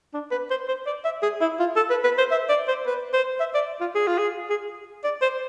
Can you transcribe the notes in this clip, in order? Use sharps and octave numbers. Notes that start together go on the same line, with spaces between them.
D4
B4
C5
C5
D5
E5
G#4
E4
F4
A4
B4
B4
C5
E5
D5
C5
B4
C5
E5
D5
F4
G#4
F4
G#4
G#4
D5
C5